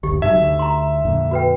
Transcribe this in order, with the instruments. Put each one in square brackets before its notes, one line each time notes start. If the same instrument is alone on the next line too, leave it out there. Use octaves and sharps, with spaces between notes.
[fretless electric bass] F#1 D2 [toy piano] G4
[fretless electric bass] G2 C3 F#3 [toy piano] D#4 [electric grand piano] E5
[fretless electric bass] D2
[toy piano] A#5 C6
[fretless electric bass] F2 A#2 D3
[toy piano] F#4 B4 G5